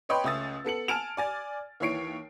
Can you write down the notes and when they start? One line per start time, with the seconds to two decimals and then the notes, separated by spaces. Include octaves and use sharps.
0.09 B4 C#5 D#5 G5 B5 C6
0.24 C#2 A3 C#4 D#6 E6 A6
0.65 B3 A4 C#7 F#7
0.88 G#5 A5 F6 D7 E7 F7
1.17 D5 G#5 A6
1.80 D#2 E3 C#5 C7 D7